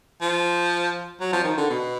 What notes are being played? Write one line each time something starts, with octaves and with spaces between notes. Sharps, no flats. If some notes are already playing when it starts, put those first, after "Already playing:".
F3
F#3
F3
D#3
D3
B2